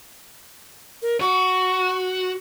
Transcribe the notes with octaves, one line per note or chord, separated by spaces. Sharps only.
A#4
F#4 C#6